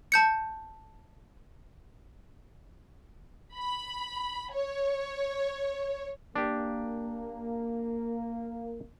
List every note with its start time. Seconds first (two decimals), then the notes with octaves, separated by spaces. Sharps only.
0.12 A5 G6 C#7
3.56 B5
4.52 C#5
6.36 A#3 D4 G4